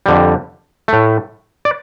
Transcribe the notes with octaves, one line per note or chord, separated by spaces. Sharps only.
F2 D3 G3
A2 A3
D5